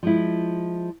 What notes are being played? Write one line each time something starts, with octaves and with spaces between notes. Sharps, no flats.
F3 G#3 E4